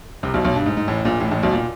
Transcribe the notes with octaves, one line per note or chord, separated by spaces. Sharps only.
C2 C3
B1 B2
B1 B2
G2
G#2
G#2
A1 A2
A#1 A#2
A1 A2
A1 A2
B1 B2
A#2